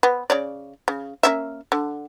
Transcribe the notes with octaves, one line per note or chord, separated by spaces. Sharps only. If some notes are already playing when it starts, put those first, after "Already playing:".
B3
C#3 C#5 D5
C#3
A#3 C#4 E5
D3